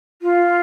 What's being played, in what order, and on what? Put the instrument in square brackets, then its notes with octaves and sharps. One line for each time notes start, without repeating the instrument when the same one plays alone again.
[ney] F4